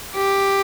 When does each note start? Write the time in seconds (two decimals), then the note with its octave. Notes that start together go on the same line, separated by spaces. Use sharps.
0.17 G4